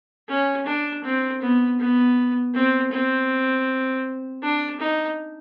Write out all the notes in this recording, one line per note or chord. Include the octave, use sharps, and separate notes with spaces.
C#4
D4
C4
B3
B3
C4
C4
D4
D#4